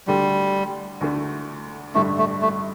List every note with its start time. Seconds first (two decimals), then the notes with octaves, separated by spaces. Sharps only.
0.07 D2 D3 G3 A3
1.01 D2 D3 A3
1.95 A1 G2 D3 G3 A3
2.18 A3
2.42 A3